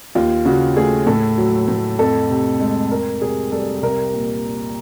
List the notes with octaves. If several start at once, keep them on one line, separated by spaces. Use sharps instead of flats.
D#2 F4
C#3 F#4
A3 G#4
A2 A4
F#3
A2
F2 A4
C3
G#3
F2 A#4
C3 G#4
G3 A4
C2 A#4
A#2